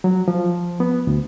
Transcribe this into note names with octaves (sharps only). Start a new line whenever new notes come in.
F#3
F3
B3
D2